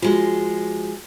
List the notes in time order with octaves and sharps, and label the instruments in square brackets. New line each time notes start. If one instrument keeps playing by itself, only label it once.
[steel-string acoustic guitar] F3 G#3 [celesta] F4 F#4